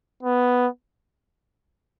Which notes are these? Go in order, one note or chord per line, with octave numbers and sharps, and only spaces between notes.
B3